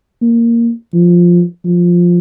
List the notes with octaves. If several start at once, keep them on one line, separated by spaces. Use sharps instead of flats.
A#3
F3
F3